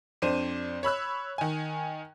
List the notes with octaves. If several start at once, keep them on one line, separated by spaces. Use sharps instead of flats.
F2 D4 C5 D#7
C#5 B5 E6 F#6
D#3 G#5